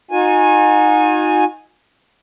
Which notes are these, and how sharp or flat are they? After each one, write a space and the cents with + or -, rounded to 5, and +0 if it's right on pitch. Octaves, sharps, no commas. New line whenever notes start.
D#4 +0 F#4 -40 G#5 +0